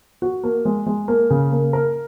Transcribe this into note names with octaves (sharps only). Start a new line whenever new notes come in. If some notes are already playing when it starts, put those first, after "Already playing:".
F#4
A#3
G#3
G#3
A#3
C#3
A#3
A#4